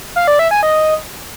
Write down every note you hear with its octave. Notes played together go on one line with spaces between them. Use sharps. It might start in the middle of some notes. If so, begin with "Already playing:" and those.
F5
D5
E5
G#5
D#5